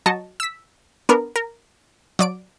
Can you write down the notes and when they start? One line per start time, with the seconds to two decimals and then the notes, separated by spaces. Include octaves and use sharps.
0.06 F#3 D#5 A5 C#6
0.40 E6 B6
1.09 B3 D4 A#4
1.36 A#4
2.19 F#3 D5 D7